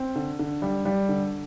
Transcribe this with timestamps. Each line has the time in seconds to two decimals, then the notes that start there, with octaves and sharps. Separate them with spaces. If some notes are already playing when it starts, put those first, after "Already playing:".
Already playing: C4
0.16 D3
0.39 D3
0.62 G3
0.85 G3
1.09 D3